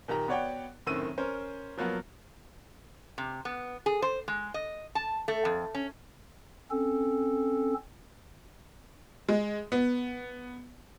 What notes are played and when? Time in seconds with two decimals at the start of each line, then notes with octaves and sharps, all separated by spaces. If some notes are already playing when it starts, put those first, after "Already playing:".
0.08 A#2 D#3 G4 A#5
0.28 B3 F#4 C#5 D5 F#5 G5
0.86 F#2 A2 D#3 C4 E6 D#7
1.18 C#4 A#4 C5
1.78 F3 F#3 A#3 B3
3.18 C3
3.45 B3
3.86 G#4
4.02 C5
4.28 G#3
4.54 D#5
4.95 A5
5.28 A3
5.45 F2
5.75 C#4
6.71 C4 C#4 A4
9.29 G#3
9.72 B3